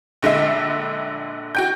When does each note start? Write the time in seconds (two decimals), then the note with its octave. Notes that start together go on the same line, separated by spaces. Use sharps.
0.22 A#1 D3 G#3 E5
1.55 F#4 G5 G6